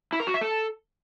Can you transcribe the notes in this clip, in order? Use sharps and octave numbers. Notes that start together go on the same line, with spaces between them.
E4
A#4
F#4
E5
A4